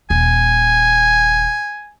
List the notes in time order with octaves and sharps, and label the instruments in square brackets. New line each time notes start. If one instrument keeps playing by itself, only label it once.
[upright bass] D#1 [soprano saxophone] G#5